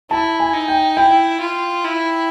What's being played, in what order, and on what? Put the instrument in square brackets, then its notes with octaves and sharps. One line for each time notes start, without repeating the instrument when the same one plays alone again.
[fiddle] E4 [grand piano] A5
[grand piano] G#5
[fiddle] D#4
[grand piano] G5
[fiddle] E4 [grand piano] G5
[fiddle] F4
E4